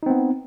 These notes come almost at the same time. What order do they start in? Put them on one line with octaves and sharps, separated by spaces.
D#4 C4 B3